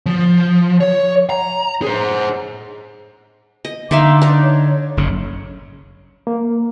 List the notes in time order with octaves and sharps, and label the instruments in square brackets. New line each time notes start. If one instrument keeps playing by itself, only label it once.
[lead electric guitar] F3
C#5
A#5
G#4 C5
[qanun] D#5
[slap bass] D3 [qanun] D#4 E5 F5 [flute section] A#5 C6 D6
[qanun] D4 D#4
[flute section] C#5
[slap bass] F#1 C#3
[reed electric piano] A#3